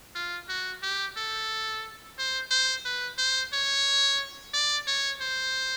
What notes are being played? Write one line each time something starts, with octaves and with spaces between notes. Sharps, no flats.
F4
F#4
G4
A4
C5
C5
B4
C5
C#5
D5
C#5
C5